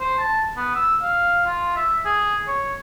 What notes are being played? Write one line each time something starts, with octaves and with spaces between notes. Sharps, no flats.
C5
A5
B3
E6
F5
F4
E5
G#4
C#5